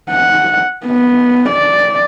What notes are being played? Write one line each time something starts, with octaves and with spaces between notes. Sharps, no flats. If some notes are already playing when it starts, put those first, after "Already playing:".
F#5
B3
D5